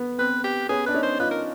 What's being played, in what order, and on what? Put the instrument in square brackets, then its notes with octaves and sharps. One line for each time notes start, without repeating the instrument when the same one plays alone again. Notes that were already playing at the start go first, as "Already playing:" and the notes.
Already playing: [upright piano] B3
[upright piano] C4 [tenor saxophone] B4
[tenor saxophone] G4
[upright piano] B3 C#4 [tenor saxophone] G#4
[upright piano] D4 [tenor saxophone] B4
[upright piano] C#4 D#4
[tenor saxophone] C5
[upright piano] D#4 F4 [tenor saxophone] B4
[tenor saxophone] A#4